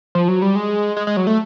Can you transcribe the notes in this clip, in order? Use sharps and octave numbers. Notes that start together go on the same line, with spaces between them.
F3
F#3
G3
G#3
G#3
G#3
F#3
A3